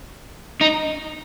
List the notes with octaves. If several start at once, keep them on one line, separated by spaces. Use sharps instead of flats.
D#4